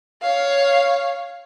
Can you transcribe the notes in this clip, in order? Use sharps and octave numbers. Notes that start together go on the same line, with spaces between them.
C#5 F5